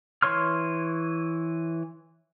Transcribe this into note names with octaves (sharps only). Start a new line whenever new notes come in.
E3 C#5 C6 F6